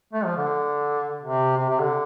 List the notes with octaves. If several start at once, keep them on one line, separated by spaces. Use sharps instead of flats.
A3
F3
D3
C3
C3
C3
D3